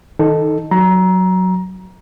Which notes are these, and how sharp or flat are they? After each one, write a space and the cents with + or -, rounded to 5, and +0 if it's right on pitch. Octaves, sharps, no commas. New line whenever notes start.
D#3 +20 D#4 +0 A4 +0
F#3 +0 A#5 +20